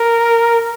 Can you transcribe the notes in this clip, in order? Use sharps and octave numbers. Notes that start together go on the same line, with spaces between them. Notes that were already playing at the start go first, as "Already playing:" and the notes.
Already playing: A#4